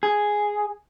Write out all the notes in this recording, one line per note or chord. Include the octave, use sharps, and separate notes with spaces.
G#4